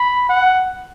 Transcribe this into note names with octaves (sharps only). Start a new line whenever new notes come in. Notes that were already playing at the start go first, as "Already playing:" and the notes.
Already playing: B5
F#5